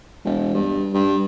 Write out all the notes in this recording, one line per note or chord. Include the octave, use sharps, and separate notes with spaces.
E1
G2
G2